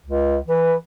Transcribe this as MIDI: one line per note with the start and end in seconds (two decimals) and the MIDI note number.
0.06 0.37 37
0.48 0.74 52
0.48 0.75 71